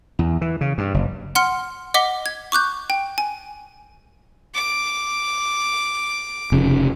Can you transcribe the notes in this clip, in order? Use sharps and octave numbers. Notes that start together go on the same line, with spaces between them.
E2
E3
C#3
G2
F#1
F#5 C6 F6 C#7
D#5 F#5 D6 B6 G7
G#6
C#6 D6 F#6 G6
G5
G#5
D6
F1 C#3